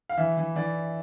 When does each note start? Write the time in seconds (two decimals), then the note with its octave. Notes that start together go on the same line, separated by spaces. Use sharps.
0.09 F5
0.18 E3 E5
0.37 E3
0.56 E3 D5